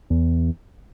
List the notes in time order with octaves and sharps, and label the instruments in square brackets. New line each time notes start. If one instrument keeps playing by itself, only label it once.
[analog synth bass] E2